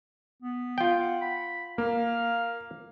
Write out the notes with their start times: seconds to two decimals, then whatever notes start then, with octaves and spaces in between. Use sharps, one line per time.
0.42 B3
0.78 F4 G5
1.00 F#5
1.21 B5
1.78 A#3 F5